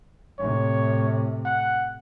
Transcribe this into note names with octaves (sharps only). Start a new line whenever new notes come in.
A2 C3 C#5
F#5